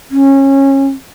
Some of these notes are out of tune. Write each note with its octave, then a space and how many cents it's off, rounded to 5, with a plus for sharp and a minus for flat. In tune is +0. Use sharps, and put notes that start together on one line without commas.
C#4 -20